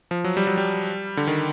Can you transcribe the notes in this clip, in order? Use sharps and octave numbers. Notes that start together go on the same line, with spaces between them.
F3
F#3
G3
F#3
G3
D3
D#3